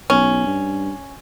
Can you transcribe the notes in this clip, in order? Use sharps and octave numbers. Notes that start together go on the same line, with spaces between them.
B1 C#4
G2